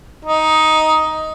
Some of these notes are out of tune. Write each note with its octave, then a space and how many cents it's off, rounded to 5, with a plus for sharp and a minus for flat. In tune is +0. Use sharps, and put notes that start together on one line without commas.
D#4 +10